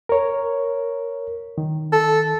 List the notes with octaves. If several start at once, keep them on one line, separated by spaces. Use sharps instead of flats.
A#4 C#5
D#3
A4